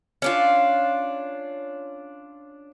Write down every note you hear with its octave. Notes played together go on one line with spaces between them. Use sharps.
C#4 D4 F4